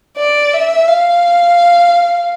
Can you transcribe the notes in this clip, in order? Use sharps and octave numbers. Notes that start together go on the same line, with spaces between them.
D5
E5
F5